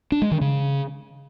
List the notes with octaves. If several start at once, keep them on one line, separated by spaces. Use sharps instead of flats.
D4
G#3
D#3
C#3